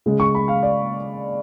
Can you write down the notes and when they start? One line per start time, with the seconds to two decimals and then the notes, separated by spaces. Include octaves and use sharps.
0.06 C#3 G#3
0.20 C#6
0.35 B5
0.48 F5
0.63 D5